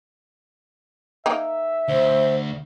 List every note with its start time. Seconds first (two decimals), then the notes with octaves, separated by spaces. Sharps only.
1.26 A#3 D#4 E5 G5
1.88 D2 C5